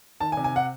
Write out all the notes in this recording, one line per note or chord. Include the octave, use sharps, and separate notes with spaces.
D#3 A5
G#5
C3
G#5
F#5